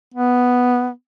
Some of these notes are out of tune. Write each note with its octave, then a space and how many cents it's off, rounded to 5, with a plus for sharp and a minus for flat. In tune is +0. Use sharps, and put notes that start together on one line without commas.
B3 +0